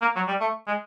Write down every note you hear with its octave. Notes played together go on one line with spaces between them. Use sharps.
A#3
F#3
G3
A3
G#3